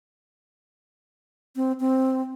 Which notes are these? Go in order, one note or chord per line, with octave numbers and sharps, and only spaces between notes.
C4
C4